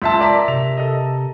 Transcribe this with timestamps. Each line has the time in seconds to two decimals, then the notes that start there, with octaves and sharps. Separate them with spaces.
0.02 C#2 E5 A5 C6
0.21 A#4 D5 E5 A#5 B6
0.48 C3 F7
0.77 A4 D#5